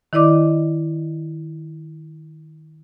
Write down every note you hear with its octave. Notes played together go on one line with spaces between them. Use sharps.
D#3 E4 D5 D#5 D6